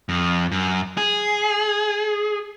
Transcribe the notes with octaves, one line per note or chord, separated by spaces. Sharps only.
F2
F#2
G#4